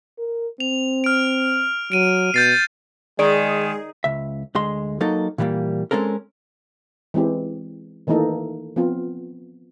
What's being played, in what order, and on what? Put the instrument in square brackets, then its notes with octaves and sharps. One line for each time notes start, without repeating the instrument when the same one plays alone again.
[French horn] A#4
[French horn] C4 [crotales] F7
[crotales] F6 D7
[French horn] F#3 [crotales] D7 D#7
[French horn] B2 [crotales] G6 A6 C7
[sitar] D#3 [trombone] G#3 [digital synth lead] G#4 [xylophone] D5 D7
[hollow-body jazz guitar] C#2 E5
D2 G#3 C6
F#3 A#3 D#4 A4
A#2 E3 G3 G#3 A#3
G#3 C4 C#4 A4 A#4
[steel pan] E3 G#3 C4 G4
D#3 E3 A3 A#3 D#4 A4
F3 B3 C4 F4